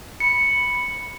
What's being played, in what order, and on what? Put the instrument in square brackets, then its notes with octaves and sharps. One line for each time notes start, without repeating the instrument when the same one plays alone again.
[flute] B5 [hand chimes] C#7